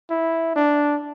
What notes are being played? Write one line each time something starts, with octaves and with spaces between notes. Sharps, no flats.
E4
D4